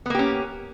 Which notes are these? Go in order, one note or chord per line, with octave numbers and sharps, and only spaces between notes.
A#3 B3 C#4 G4